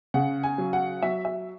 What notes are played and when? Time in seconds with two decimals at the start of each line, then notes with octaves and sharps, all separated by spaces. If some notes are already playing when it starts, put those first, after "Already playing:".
0.14 C#3 F#5
0.43 G#5
0.58 F#3
0.73 F#5
1.02 F#3 E5
1.25 E5